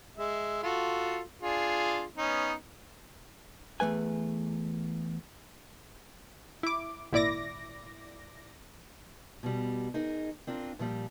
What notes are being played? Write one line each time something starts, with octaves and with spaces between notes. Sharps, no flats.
G#3 E5
F4 F#4 A4
D4 F4 G#4
B3 C#4 D#4
E2 F#3 A3 B4 G#5
E4 D6
G#1 A#2 E4 D5 D6 A#6
B2 G3
D#4 G#4 A#4
C4 D4 F4 A#4
A#2 F3 G3